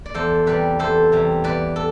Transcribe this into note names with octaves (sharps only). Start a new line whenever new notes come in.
D5
E2 A4 C5
C3 E3 G3 B4 D5
E2 A4 C5
C3 E3 G3
E2 B4 D5
A4